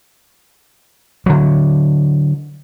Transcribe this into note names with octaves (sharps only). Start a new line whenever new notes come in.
D3 F#3